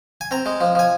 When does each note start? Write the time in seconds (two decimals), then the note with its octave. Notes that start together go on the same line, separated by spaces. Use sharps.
0.21 G#5
0.31 C4 A#5
0.46 G#3
0.61 F3
0.75 F3 G#5